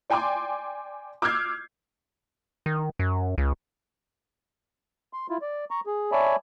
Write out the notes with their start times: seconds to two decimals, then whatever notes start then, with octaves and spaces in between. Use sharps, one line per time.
0.10 D5 G5 G#5 C6 D6
1.22 D6 E6 F6 G6 G#6 C7
2.66 D#3
2.99 F#2
3.38 C#2
5.13 C6
5.30 E4 F4
5.42 D5
5.71 A#5 C#6
5.86 G#4
6.12 C#5 D5 E5 G#5 A5 B5